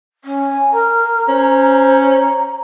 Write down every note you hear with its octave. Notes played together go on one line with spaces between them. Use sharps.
C#4
G#5
A#4 A#5
C#4 C5
A#5